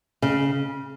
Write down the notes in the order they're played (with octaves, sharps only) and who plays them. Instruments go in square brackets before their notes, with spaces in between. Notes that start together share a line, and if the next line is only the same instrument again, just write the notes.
[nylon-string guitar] C#3